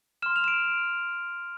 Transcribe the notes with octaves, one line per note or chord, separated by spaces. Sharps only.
C6 F6 E7
F7
E7
D7